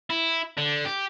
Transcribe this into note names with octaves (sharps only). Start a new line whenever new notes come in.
E4
D3
G4